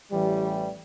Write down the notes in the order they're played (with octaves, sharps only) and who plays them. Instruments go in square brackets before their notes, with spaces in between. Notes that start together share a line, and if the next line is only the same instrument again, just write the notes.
[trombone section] A1 E3 G3